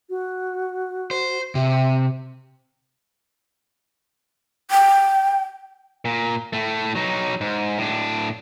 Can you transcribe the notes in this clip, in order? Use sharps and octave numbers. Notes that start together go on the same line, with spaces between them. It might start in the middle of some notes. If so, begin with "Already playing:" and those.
F#4
C5
C3 E5
G5
A#2
A2 A3
F#3 D#4
G#2
A2 D4